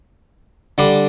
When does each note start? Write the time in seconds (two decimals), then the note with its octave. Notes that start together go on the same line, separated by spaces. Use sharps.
0.78 D3 G3 D4